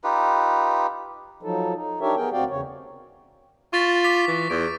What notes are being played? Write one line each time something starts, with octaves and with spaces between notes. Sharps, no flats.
D#4 F4 G4 B4
F3 F#3 D#4 A4
D#4
D4 D#4 G4 A#4 C#5 E5
B3 G#4 A#4 G5
D2 C4 F#4 D5 F5 G5
E2 C#3 C#5
F4 C#6 A6 B6
D6 B6
E3
E2 D7